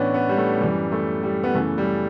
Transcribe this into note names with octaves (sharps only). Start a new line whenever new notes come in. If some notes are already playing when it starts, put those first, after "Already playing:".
Already playing: A2 E3 B3 C#4 D4
B3
G3
A3
F#2 E3 G3
A3
G3
B3
F#2 C#3 E3 A3
G3